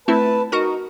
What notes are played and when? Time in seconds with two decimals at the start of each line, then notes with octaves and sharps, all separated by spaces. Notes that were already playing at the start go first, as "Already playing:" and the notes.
0.08 A3 C4 E4 B4 A5
0.52 D#4 F#4 A#4